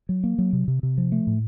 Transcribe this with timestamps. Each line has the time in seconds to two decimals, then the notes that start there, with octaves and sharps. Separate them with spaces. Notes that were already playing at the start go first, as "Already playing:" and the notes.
0.09 F#3
0.24 A#3
0.38 F#3
0.53 C3
0.68 C3
0.83 C3
0.98 F3
1.12 A3
1.27 A2